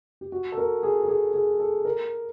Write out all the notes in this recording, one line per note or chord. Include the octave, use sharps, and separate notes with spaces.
G4
F#4
A4
A#4
G#4
A4
G#4
G#4
A4
A#4